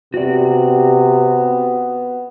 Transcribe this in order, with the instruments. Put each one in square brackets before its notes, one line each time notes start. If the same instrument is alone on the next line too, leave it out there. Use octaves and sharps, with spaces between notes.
[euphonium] C3 [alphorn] B3 [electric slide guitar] F#4 D5